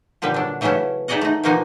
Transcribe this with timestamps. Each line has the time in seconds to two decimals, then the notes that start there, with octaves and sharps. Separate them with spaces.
0.22 A#2 D3 G3 B4
0.34 F#3 D4
0.61 C#3 E3 F#3 A3 C#4 E4
1.08 D#4 E4 G#4 D5 D#5 F#5
1.21 A3 D#4
1.43 B2 F3 A#3 D#4 F#4 G#5